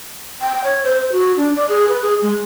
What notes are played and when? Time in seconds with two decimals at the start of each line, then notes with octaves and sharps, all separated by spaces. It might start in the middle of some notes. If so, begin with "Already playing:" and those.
0.41 G5
0.64 C#5
0.84 C5
0.98 C5
1.12 F#4
1.37 D4
1.56 D5
1.69 G#4
1.88 B4
2.02 G#4
2.22 G#3